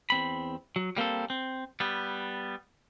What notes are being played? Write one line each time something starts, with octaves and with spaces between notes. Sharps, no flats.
E2 C4 B5
F#3
G3 A#3 C4 A4
C4
G3 B3